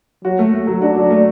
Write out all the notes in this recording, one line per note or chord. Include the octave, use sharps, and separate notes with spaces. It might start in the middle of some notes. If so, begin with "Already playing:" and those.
F#3 F#4
A3
A3
F#3
D4 F#4
F#3
A3